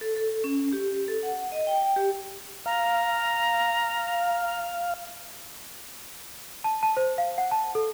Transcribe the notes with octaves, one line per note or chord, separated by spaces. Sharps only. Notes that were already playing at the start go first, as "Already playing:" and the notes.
A4
A4
C#4
G4
A4
F#5
D#5
G5
G4
F5 A#5
A5
A5
C5
F5
F#5
A5
A4